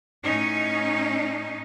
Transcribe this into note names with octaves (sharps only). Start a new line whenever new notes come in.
A2 C#4 D#4